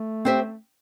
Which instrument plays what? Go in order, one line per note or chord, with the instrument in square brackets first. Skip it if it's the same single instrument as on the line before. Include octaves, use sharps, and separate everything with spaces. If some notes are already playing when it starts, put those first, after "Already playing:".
Already playing: [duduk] A3
[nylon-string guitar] C4 G4 C5 E5